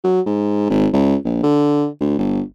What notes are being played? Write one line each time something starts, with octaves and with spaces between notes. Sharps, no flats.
F#3
G#2
G#1
C#2
A#1
D3
D2
G1